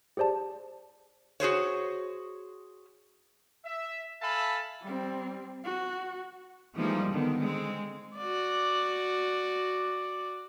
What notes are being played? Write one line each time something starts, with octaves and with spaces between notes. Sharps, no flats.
G4 G#4 C5 D5 A5
F#4 G#4 C5 C#5
E5
A4 E5 F5 G#5 A5 B5
G3 C4
F#4
E3 F3 G3 G#3 A#3 D#4
D3 D#3 B3
G#3 C4
F#4 D5